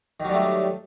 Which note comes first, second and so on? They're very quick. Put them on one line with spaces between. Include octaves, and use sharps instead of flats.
D#3 F#3 G3 A3